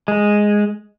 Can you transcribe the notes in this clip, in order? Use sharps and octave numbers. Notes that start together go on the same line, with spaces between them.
G#3